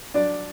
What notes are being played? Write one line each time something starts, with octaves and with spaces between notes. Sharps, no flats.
F#3 D4 D5